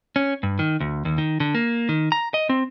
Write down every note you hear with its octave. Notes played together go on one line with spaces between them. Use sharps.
C#4
G2
D#3
D2
D#2
D#3
D3
A#3
D#3
A#5
D#5
C4